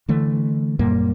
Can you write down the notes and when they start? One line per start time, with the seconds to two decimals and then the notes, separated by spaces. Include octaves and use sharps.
0.09 D3 E3 A3
0.79 F#2 A#2 G3 A#3